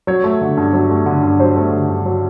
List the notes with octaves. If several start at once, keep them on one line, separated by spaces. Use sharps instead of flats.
F#3 C#5
A3
D3
G2
F#3
A3
D3
G2
F#3 C5
A3
D3
G2
F#3